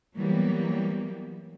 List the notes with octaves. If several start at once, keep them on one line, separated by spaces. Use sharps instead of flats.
E3 F#3 G3 A#3 B3